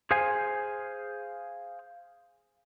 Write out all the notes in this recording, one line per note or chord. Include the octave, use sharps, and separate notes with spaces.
G#4 C5 F5 G#5